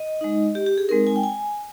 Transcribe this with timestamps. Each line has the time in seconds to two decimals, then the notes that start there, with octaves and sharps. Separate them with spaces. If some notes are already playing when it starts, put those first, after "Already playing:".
Already playing: D#5
0.21 G#3 D#4
0.55 G4
0.66 G4
0.78 G#4
0.89 G#3 C4 D#4 A#4
1.07 G#5
1.16 G5
1.23 G#5